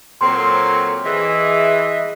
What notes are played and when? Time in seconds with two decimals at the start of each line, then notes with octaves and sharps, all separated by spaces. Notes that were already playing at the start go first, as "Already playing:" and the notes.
0.21 A#2 F#3 C4 A4 C6
1.05 E3 G#4 D#5 E5